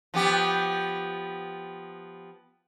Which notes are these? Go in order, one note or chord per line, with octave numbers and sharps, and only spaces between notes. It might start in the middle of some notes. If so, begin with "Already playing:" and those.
F3 B3 G4